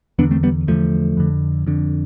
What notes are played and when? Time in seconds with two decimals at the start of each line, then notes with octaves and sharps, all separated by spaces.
0.19 E2 D3 B3 D4
0.31 A3 C4
0.43 G3 B3
0.67 E2 D3 F3 A3
1.17 F2 D3
1.66 F2 D3